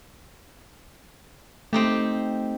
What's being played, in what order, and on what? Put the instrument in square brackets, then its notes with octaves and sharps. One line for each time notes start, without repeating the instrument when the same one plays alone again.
[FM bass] A3 [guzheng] C4 D#4 G4